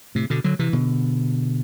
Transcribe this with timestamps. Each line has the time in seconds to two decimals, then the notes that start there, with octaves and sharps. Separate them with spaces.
0.15 A2 C3
0.30 B2 D3
0.44 D3 F#3
0.59 C3 E3
0.73 B2 D3